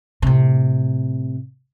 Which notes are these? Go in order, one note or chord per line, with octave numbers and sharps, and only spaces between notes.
A2 C3